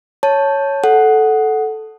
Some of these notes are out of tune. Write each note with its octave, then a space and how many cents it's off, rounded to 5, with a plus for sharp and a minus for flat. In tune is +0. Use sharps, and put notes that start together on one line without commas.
C#5 +0 A5 +0
A4 -10 F#5 +0